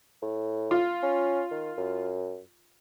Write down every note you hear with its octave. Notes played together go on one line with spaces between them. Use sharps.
A2
F4
C#4
D#3
F#2